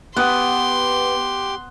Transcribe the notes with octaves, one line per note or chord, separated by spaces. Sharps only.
B3 G4 F#5 C6 D6 D#6 F#6